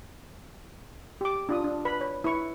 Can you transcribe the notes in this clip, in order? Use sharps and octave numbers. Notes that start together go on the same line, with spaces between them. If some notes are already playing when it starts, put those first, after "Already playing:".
G4 D6
D4 F4 D#6
D4
B4 B5
C#5
E4 B4 C#6